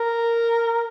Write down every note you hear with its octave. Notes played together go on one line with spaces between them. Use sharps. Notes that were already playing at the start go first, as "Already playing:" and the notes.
Already playing: A#4